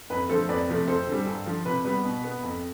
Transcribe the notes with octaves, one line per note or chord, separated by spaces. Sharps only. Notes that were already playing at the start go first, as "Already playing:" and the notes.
F2 B4
D3 F3 A3 A4 C5
F2 B4 D5
C3 F3 A3
F2 A4 C5
D3
G3
G2
D3 F3
C3 B4
G3 B3 B4
B2
B3
F2